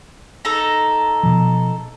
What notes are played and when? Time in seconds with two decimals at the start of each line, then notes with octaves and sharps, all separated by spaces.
0.45 D#4 A4 A#5
1.23 B2 F3